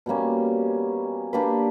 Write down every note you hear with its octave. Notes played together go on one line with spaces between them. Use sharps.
B2 G3 A#3 C#4
A#3 D4 G4 B4